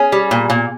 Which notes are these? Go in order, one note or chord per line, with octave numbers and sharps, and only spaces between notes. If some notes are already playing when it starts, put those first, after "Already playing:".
Already playing: C#4 G#4
G3
A#2
A#2